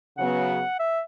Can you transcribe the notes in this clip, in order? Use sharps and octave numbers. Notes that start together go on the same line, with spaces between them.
C#3 F#3 B3 F#5
E5